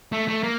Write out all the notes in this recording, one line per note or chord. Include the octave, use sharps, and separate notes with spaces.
A3
A3
A#3